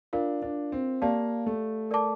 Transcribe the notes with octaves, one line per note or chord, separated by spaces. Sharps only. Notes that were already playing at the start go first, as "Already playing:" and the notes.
D4 F4 A#4 F5
D4
C4
A#3 G4 D5 F5 A5
A3
A#4 D5 A5 D6